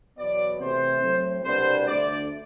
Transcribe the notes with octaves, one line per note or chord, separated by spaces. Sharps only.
E2 B2 F#3 B3 D5
C3 E3 A3 C4 C5
A2 F#3 A3 C4
C2 B2 G3 B3 D4 C5
D2 D3 A3 D4 D5